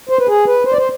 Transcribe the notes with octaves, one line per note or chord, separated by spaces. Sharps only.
C5
B4
G#4
B4
C5
D5
C5